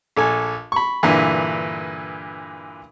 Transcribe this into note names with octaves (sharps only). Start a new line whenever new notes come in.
A#1 A4 G#5
B5 C#6
G2 A#2 D3 E3